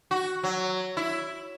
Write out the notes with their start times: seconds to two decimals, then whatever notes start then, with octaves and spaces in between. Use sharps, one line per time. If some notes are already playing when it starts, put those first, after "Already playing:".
0.11 F#4
0.43 F#3
0.97 E4